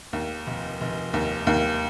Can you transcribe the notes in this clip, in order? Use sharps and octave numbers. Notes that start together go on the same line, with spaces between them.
D#2
F1
F1
D#2
D#2